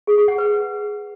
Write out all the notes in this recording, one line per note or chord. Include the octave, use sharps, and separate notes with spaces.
G#4
G#4
F#5
B4